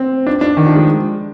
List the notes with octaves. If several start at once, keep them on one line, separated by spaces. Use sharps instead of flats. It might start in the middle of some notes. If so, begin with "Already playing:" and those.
Already playing: C4
D4
D4
D#3
F3
G#3